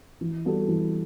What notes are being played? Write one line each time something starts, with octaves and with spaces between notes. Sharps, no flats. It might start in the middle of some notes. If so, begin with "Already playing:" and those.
E3
G3 B3 F#4 A4
E3